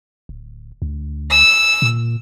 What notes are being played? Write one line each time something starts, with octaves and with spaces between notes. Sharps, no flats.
D1
D2
E6
A#2